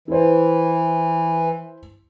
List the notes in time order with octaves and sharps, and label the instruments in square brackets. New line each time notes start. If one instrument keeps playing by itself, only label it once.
[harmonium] E3 [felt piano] E4 C5